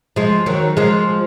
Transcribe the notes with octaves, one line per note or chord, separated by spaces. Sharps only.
F3 G#3
D#3 F#3
F3 G#3